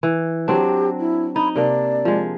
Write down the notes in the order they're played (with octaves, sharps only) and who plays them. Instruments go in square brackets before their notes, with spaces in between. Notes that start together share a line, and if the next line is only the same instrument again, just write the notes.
[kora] E3
[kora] F#3 C4 D4 [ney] G4
[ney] E4
[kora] D#4 [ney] B5
[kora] C3 A#3 D4 [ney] D5
[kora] F3 G#3